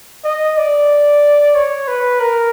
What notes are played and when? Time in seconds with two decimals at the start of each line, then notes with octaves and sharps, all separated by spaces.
0.24 D#5
0.57 D5
1.55 C#5
1.88 B4
2.20 A#4